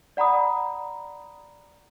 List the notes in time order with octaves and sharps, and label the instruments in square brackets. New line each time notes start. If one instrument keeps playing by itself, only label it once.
[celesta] D5 F#5 A#5 B5 D#6